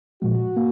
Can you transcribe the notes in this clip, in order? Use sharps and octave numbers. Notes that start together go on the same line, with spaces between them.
A#2 F3 G#3 F#4
A#3